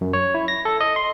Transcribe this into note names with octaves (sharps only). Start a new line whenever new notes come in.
F#2
C#5
E4
A#6
A4
D#5
C6